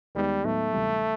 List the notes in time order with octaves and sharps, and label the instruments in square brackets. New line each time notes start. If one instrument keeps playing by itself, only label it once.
[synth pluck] D#2 D#3 G#3 B3 D#4 [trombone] G3
[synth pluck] A2 F#3 B3 D#4 [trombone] A3
[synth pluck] D2 C3 E3 G3